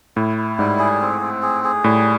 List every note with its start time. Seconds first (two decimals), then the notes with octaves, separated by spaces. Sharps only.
0.16 A2 E4
0.38 E4
0.59 G#2 G3
0.79 G#4
1.01 C4
1.21 C4
1.42 G#4
1.64 G#4
1.84 A2 G3